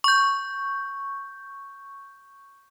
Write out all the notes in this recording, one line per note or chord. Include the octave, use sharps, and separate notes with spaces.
C#6 G6